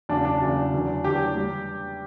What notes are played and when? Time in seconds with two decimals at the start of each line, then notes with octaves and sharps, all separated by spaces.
0.09 E2 C#3 F#3 D4
0.25 D4
0.41 E2 C#3 F#3
0.73 E2 D3 F#3
1.04 E2 D3 F#3 G4
1.37 G3